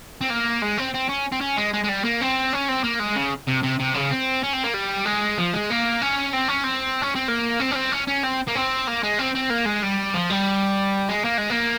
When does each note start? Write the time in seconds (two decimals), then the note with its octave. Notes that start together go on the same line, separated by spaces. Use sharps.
0.21 C4
0.30 A#3
0.62 G#3
0.78 C4
0.94 C4
1.09 C#4
1.32 C4
1.41 C#4
1.57 G#3
1.73 G#3
1.84 G#3
1.88 G3
2.04 A#3
2.21 C4
2.53 C#4
2.69 C4
2.84 A#3
3.00 G#3
3.16 C#3
3.48 C3
3.63 C3
3.80 C3
3.94 C#3
4.11 C4
4.43 C#4
4.53 C4
4.64 A#3
4.74 G3
5.06 G#3
5.38 F3
5.53 G#3
5.70 A#3
6.02 C#4
6.33 C4
6.49 C#4
6.64 C4
7.02 C#4
7.15 C4
7.28 A#3
7.60 C4
7.71 C#4
7.76 C4
7.92 C#4
8.08 C#4
8.24 C4
8.48 A#3
8.55 C4
8.87 A#3
9.03 G#3
9.19 C4
9.35 C4
9.50 A#3
9.66 G#3
9.83 G3
10.15 F3
10.30 G3
11.09 G#3
11.25 A#3
11.38 G#3
11.50 A#3